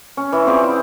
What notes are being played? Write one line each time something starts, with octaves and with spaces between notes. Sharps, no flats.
C#4
E3
C4 F4 G#4 D5
E4